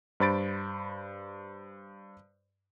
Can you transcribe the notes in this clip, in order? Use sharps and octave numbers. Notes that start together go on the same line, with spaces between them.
G2 C5 B5 A6 D7